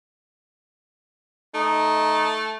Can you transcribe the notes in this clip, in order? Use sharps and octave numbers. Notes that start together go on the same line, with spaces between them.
A3 D#4